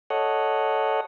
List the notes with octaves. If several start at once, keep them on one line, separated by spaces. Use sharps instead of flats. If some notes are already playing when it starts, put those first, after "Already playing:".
A4 C#5 D#5 F#5